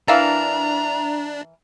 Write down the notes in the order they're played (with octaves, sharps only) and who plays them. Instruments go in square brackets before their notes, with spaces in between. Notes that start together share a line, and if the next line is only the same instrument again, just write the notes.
[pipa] E3 A#4 [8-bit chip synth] D4 [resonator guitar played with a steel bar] D5 E5 F5 [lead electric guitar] A#5